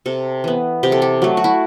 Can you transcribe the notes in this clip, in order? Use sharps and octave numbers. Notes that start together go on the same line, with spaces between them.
C3 A4
E3 B3
C3 G4
A4
G4
F#3 A3
F#4
E4